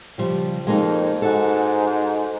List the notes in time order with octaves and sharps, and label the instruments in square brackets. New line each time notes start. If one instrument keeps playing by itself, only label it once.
[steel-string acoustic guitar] C#3 F3 G3
[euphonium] F2 [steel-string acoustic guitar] G#3 A#3 D#4
[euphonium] G#2 [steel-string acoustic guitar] F#4 A4